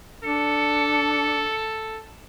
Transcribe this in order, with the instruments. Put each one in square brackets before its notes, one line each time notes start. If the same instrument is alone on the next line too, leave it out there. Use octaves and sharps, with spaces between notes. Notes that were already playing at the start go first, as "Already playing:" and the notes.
[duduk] D4 [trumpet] A4 [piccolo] C#7